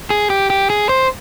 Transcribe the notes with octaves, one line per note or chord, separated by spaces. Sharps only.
G#4
G4
G4
G#4
C5